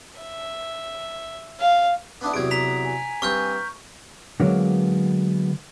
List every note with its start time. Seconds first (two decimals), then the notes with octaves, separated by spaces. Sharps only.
0.20 E5
1.60 F5
2.21 B3 D4 E4 D#6
2.34 E2 C3 F#3 G#6 D7
2.51 A#5 B6 F7
2.84 G#5
3.22 G2 C4 C#6 F6 G6
4.40 D3 F#3 G#3 A#3 B3